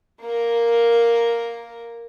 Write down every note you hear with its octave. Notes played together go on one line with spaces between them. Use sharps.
A#3 A#4